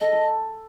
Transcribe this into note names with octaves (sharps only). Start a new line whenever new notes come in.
A4 D#5
A4